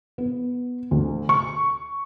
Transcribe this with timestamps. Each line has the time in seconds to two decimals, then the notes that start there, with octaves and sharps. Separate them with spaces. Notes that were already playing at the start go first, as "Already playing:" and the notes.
0.18 B3
0.91 D2
1.29 C#6